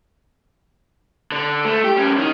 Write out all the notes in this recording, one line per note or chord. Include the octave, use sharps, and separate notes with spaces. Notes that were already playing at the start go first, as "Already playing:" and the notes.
D3
A3
G4
G3 C#4
D#3 D#4